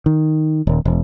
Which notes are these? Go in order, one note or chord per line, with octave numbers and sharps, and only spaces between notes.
D#3
D#1
E1